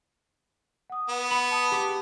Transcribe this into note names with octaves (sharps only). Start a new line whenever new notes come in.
F#5 D#6
B3
B5 C#7
A5 D#6
G4